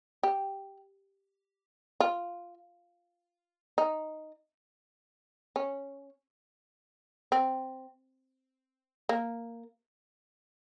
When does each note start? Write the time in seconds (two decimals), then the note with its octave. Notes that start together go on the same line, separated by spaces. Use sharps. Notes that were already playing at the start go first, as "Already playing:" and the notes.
0.23 G4
2.00 F4
3.78 D#4
5.56 C#4
7.32 C4
9.09 A#3